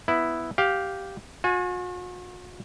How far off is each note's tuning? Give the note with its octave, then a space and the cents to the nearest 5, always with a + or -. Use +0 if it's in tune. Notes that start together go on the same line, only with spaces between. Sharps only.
B3 +0 E4 +0
G4 -5 F5 +10
F#4 -45 G#5 +10